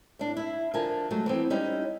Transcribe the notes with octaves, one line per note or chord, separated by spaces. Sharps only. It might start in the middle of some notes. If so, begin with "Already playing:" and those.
A2 D4
E4 E5
D3 F3 F4 A#4 G#5 A5
F#3 G#3 A3
E3 B3 C4
G3 G#3 C#4 D#4 E4